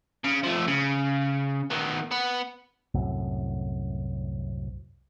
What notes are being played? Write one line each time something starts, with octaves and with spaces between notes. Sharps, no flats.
C#3
F3 A3
C#3
D#3 B3
B3
C2 F#2 A2